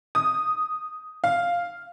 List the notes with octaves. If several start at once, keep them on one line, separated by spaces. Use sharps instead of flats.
D#6
F5